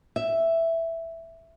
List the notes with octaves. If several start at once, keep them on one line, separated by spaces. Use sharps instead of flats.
E5